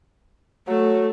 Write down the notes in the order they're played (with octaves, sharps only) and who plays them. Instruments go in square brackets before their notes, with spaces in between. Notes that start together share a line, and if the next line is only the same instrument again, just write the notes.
[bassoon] F#3 [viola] A3